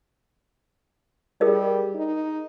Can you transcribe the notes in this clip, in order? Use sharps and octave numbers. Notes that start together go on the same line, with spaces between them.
G3 G#4 A#4 D#5
D#4